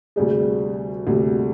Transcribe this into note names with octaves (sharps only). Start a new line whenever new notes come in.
D2 C3 G3 G#4
D2 C3 G3